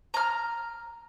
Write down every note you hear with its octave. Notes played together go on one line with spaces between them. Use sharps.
A#5 F6